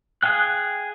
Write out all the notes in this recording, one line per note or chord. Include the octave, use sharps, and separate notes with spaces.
G#4 F5 G5 F#6